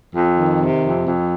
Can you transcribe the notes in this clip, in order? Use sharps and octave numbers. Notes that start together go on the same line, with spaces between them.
F2
D#3
C3
F2
F2